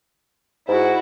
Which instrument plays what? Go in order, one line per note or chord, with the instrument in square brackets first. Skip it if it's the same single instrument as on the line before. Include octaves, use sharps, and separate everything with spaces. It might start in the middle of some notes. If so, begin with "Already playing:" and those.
[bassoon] G#2 [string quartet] E4 F#4